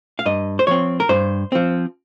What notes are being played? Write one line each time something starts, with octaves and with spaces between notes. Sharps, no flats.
F5
G2 D#5
C5
F3 C4 C#5
A#4
G2 C5
F3 C4